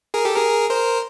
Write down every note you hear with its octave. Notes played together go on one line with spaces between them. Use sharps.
G#4 A#4
G4 A4
G#4 A#4
A#4 C5